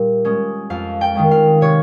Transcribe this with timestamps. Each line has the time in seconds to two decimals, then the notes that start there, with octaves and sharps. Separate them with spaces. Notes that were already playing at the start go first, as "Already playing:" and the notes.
Already playing: A#2 G3
0.25 G#3 C#4
0.70 F2 F5
1.01 G5
1.15 D#3 G#3 C#4
1.31 F5
1.61 C3 C#5